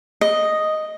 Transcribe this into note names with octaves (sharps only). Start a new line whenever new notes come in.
D#5